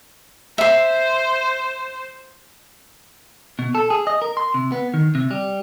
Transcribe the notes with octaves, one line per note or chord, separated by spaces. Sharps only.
C5 E5 C6
B2
A4
G#4
D#5
A#4
C6
C3
B3
D#3
C3
G3